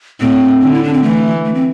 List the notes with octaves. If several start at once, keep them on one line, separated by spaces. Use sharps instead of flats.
A2 C4
D3
E4
D4
C4
E3 A3
A3
C4